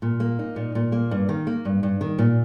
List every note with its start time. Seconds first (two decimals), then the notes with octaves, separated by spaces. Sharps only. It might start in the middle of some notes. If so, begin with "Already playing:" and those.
0.02 A#2
0.20 A#3
0.39 D#4
0.56 A#2
0.75 A#2
0.92 A#3
1.11 G2
1.29 D#3
1.47 A#3
1.65 G2
1.83 G2
2.01 D#3
2.19 A#2